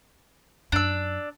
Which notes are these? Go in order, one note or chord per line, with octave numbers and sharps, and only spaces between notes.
F#2 D4 E6